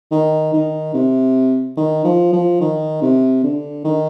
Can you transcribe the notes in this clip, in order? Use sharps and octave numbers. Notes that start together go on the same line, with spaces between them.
D#3
D#3
C3
D#3
F3
F3
D#3
C3
D3
D#3